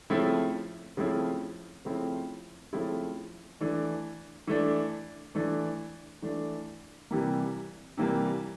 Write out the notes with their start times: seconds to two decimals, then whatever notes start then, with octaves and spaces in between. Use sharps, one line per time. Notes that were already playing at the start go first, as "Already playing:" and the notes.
0.10 C#3 F3 A3 C4 E4
0.97 C#3 F3 A3 C4 E4
1.85 C#3 F3 A3 C4 E4
2.73 C#3 F3 A3 C4 E4
3.61 E3 A3 D4
4.47 E3 A3 D4
5.35 E3 A3 D4
6.22 E3 A3 D4
7.11 C3 E3 G3 A#3
7.98 C3 E3 G3 A#3